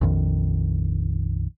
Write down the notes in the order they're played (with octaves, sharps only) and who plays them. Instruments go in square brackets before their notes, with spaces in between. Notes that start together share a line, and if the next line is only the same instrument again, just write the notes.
[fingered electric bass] A#1 F2 D#3